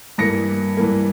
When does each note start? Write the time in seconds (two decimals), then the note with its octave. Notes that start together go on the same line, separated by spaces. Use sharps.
0.18 G2 E3 A#3 A#6 C#7
0.77 G2 E3 A#3